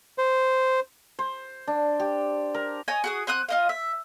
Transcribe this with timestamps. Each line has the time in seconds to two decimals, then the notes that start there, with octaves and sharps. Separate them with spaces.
0.18 C5
1.19 C5
1.68 D4
2.00 G4
2.54 A#4
2.88 C#5 D#5 G#5
3.04 F#4 G#4 D#6
3.27 C4 F#5 D#6 F#6
3.48 F4 D#5 F5
3.69 E5